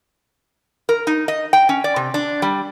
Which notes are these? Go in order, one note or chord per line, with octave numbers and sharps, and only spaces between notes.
A#4
D#4
D#5
G5
C#4
D5
C3
D4
G3